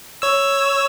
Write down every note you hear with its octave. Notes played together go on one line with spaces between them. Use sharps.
C#5 E6